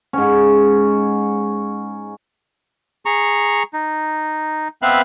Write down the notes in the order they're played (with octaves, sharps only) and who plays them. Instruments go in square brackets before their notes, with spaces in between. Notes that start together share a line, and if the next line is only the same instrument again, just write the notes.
[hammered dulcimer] G#2 C#4
[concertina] G#4 A#5 C#6
D#4
B3 C4 B4 E5 F5 B5